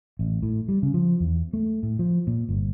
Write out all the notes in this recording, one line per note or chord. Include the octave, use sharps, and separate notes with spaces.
A1
A2
G3
C#3
F3
E2
A3
A2
F3
A#2
G1